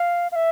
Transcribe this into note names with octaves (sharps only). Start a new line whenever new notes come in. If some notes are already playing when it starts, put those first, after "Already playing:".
Already playing: F5
F5
E5